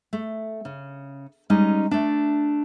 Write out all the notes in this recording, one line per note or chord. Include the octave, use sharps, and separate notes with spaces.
A3
C#3
G3 G#3 C#4 D#4
A3 D4